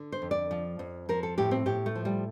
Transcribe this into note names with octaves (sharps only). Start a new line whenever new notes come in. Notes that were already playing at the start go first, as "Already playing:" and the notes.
Already playing: D3
C5
F2
D5
F3
F2
F3 A#4
A4
A2 G4
C4
A2 G4
A3
F3
G3